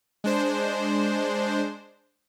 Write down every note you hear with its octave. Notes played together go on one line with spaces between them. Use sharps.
G#3 D4 C5